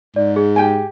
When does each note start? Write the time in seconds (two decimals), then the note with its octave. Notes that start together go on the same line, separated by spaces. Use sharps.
0.16 G#2 D5
0.36 G#4
0.56 G4 G5 G#5